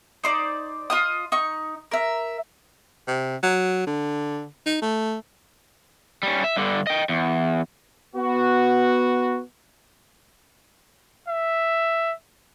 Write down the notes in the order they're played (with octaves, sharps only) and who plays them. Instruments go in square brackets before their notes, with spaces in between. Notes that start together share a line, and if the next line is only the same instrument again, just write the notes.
[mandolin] D#4 C5 D5
F4 D#5 D#6
D#4 C#6
A#4 E5
[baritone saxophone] C3
F#3
D3
D#4
A3
[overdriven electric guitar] G3 C#4
E5
G2 D3
D#5 G5
E2
[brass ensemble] B3 F#4
[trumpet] E5